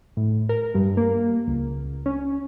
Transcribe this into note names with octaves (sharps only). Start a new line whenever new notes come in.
A2
A#4
G2
A#3
C#2
C#4